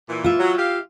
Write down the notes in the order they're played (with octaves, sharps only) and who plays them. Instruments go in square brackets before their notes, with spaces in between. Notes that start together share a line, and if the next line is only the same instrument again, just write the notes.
[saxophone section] A#2 E3
[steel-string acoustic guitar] F4 E5
[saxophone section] F#3
G4 F5